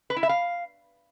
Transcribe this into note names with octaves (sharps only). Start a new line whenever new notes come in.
B4
E4
E5
F5